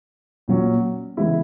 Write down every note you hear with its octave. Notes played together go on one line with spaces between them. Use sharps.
A#2 F#3 C#4
C#3 E3 G#3 B3 E4 E5